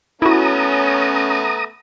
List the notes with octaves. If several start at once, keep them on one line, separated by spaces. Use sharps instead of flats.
A3 B3 C#4 E4 F#4 A#5 D#6